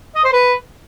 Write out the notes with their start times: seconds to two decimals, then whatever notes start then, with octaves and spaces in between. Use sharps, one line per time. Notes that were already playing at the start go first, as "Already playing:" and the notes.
0.15 D#5
0.24 C5
0.33 B4